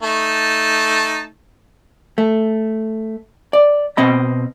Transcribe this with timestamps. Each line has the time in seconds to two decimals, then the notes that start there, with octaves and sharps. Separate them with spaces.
0.03 A3 D#4 A5
2.18 A3
3.53 D5
3.97 B2 C4 D#5 B5